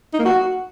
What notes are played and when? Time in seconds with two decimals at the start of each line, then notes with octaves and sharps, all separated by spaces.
0.13 D#4
0.19 A#3
0.25 F#4